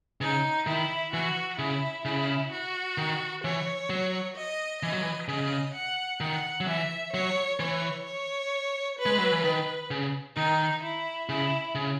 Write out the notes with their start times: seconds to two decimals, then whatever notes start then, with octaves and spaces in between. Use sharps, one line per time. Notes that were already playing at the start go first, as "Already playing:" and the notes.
0.21 C#3 D#4
0.67 D#3 E4
1.14 E3 F#4
1.59 C#3 E4
2.05 C#3 E4
2.51 F#4
2.98 D#3
3.44 E3 C#5
3.90 F#3
4.36 D#5
4.82 E3 D#5
4.92 F#3
5.01 E3
5.28 C#3 D#5
5.75 F#5
6.20 D#3 F#5
6.60 F#3
6.67 E3 E5
7.13 F#3 C#5
7.60 E3 C#5
8.05 C#5
8.99 B4
9.06 G#3
9.19 F#3
9.32 E3
9.44 D#3 B4
9.91 C#3
10.36 D#3 D#4
10.83 E4
11.29 C#3 E4
11.75 C#3